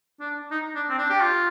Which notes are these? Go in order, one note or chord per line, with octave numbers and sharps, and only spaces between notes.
D4
D#4
D4
C4
D4
G4
F4